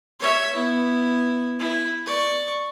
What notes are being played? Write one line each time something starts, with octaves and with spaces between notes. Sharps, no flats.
C#5 E5
B3 E4
E4
D5 C#6